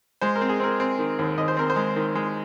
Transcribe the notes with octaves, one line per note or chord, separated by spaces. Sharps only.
G#3 C5
A#4
C4
G#4
C4 A#4
C4
D#3
D#2
D#2 D#5
C5
C4 A#4
C5
G#3
D#3
G#3